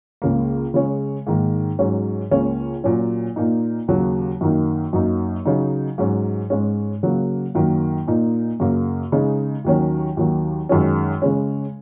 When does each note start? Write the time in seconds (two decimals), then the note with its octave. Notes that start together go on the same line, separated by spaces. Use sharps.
0.22 C#2 C#3 A#3
0.74 C#3 G#3 C#4
1.27 G#2 D#3 A#3
1.79 G#2 F#3 C#4
2.31 C#2 C#3 A#3 C#4
2.84 A#2 F#3 C#4
3.36 A#2 A#3 D#4
3.88 D#2 C#3 F#3 A#3
4.41 F#2 D#3 A#3 D#4
4.93 F#2 F#3 A#3 D#4
5.45 C#3 F#3 D#4
5.98 G#2 F#3 C#4
6.50 G#2 G#3 C#4
7.03 C#3 F#3 A#3
7.55 F#2 D#3 F#3 A#3
8.07 A#2 A#3 D#4
8.60 F#2 C#3 A#3
9.12 C#3 G#3 D#4
9.64 D#2 D#3 F#3 C#4
10.17 D#2 D#3 F#3
10.69 F#2 D#3 G#3 C#4
11.22 C#3 G#3 C#4